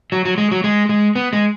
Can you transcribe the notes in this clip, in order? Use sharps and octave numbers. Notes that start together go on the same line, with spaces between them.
F#3
F#3
G#3
F#3
G#3
G#3
B3
G#3